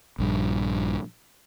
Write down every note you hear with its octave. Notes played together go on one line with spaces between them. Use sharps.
A#1 G2